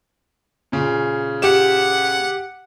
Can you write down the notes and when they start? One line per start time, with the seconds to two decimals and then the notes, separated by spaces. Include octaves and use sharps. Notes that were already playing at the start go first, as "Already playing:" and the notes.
0.72 A#2 C#3
1.42 G4 F#5 E7